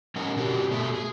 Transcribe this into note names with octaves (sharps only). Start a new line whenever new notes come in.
G3 C#4 A#4 D#5 F#5
B2 D4 F#4 G4
A3 F#4 G#4 E5
G#4